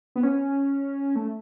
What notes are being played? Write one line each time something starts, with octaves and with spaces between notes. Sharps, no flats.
B3
C#4
A3